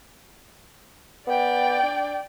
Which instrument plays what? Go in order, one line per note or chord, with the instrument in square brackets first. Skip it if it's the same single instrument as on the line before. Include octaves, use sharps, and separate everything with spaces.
[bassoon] B3 [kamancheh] D5 G5
[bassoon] D4